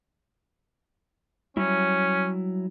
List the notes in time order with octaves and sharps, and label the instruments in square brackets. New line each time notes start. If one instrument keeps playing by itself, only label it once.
[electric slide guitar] F#3 G3 E4 [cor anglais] C#4